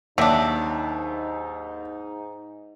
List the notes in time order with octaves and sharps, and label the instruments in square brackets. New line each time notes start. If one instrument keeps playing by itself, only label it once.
[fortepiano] D#2 E5 [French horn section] G#2 D#4 [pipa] F#3 D4